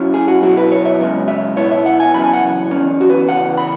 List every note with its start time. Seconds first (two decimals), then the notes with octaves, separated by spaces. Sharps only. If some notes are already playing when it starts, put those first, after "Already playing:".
Already playing: F#2 F#3 C#4 E4
0.14 G#4
0.28 F#4
0.42 B2 F#3 E4 F#4
0.57 B4
0.72 C#5
0.85 E5
1.00 F#2 C#3 G#3
1.28 E5
1.56 B2 B3 E4 C#5
1.71 E5
1.86 F#5
2.00 G#5
2.14 F#2 C#3 E3 B5
2.24 G#5
2.33 F#5
2.72 E3 C#4
2.76 E2
3.01 F#4
3.10 B4
3.29 E2 C#3 E3 F#5
3.57 B5